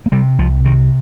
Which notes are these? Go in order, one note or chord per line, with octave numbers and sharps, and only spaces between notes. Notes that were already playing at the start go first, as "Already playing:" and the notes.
A#3
C3 G3
C2 F3
C3 D#3